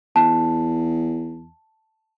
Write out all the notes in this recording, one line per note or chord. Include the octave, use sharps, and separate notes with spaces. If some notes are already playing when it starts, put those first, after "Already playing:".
E2 A5